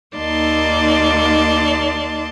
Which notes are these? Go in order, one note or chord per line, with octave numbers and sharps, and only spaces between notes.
D#2 A#3 D#4 D5 A5 C6